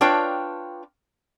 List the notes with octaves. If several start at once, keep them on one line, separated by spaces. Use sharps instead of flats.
D4 F4 B4 C#5 G5